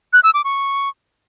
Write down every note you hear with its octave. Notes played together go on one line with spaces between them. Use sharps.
F#6
E6
D6
C#6